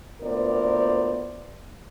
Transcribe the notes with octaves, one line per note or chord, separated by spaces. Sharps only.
D2 A#2 B3 A#4 C5 D5